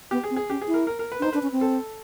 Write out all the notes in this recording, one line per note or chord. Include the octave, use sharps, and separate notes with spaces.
B3 G4
G#4
C4
G#4
C#4 G4
G#4
E4
A#4
A#4
A#4
B4
D4
D#4 C5
D4 B4
C#4
C4
A4